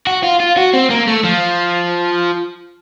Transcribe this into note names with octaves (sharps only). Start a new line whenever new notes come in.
F#4
F4
F4
F#4
C4
A#3
A3
F3